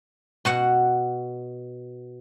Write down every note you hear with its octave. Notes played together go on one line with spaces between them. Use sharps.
B2 F#4 F#5